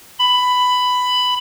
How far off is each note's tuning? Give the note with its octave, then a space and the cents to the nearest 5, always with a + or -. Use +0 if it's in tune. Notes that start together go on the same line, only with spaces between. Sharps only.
B5 +10